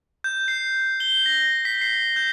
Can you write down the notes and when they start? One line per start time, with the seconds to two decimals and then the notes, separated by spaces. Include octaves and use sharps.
0.24 G6
0.48 C7
1.00 G7
1.26 A#6
1.65 B6
1.81 C7
2.16 G6